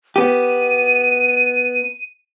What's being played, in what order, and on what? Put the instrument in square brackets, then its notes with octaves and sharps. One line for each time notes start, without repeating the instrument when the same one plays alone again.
[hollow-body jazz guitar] B3 G4 [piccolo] D#7